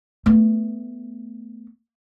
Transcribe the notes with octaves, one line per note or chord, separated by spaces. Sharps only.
A3 B3